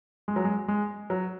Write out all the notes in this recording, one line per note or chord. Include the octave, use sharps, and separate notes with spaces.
G#3
F#3
G#3
G#3
F#3